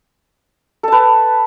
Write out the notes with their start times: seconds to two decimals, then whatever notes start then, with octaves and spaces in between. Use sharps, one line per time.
0.83 A4
0.88 A5
0.92 B4